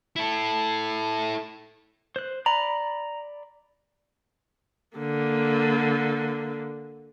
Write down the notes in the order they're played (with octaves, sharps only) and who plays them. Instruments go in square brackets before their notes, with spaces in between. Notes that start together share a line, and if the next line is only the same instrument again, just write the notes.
[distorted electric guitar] E4 A4
[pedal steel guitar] C5 F#6
[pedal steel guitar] D5 B5 [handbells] A#5
[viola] D3 A#3